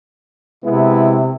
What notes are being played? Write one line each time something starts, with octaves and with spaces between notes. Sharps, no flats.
C3 G#3 B3 E4